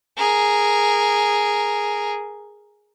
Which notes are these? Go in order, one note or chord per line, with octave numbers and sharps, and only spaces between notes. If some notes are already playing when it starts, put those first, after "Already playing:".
G#4 A#4